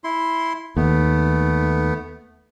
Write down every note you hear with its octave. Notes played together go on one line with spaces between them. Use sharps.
E4 C6
D#2 A3 B3